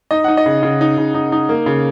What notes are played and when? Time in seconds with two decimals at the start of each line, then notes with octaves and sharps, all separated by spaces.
0.11 D#4 D#5
0.24 D#4 F#5
0.37 D#5
0.46 C#3
0.63 C#3
0.81 D#4
0.98 C#3
1.14 D#4
1.32 D#4
1.49 A#3
1.66 C#3